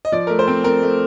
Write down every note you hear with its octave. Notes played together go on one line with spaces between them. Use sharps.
D#5
F3 D5
A3 A#4
C5
C4
C4 A#4
A3